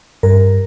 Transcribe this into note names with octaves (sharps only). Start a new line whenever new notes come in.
G2 A#4